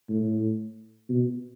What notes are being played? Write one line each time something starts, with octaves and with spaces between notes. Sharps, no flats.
A2
B2